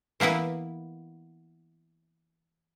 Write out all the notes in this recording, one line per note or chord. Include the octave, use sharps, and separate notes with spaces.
E3 A#3 B3 E4 B4